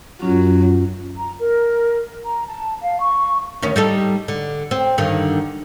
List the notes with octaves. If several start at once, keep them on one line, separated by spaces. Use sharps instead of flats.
F#2 F#3 C#4 F4
A#5
A#4
A#5
A5
F5
C#6
D2 D#3 C#4
G3 D#4 A4
D3
C4
G2 D3 D#3